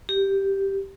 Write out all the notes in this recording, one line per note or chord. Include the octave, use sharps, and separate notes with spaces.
G4